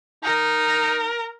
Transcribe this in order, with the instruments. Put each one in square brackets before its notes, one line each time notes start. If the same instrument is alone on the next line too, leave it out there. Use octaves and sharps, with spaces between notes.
[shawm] D#4 [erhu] A#4